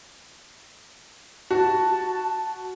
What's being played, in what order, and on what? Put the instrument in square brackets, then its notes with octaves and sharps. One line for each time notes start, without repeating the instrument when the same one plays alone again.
[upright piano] F#4 [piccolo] A5